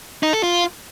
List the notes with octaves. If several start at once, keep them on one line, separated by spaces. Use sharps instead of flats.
D#4
A4
F4